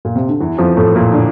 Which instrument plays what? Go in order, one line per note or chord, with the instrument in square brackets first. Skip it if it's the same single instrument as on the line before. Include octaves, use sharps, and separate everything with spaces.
[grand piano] A#2
C3
D3
E2 E3
F2 F3
A2 A3
A#2 A#3
D3 D4